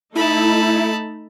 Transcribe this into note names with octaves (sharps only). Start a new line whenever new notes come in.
A3 D#4 E4 A4 A5 B5